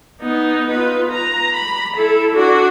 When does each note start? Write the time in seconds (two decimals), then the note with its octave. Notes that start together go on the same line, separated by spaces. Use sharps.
0.21 B3 D#4
0.70 F4 B4
1.11 A#5
1.55 B5
1.96 E4 A4
2.35 D4 F#4